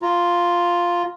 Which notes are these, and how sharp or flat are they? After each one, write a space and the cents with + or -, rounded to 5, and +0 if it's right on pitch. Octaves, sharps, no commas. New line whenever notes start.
F4 +0 A#5 -5